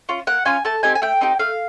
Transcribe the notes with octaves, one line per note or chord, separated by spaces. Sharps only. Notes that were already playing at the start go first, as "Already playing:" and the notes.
C#4 F4
A#3 F#5
C#4 F4 G#5
A3 A5
C4 D#4 G4 G#5
G#5
A3 G5
C4 D#4 G4
A3 F5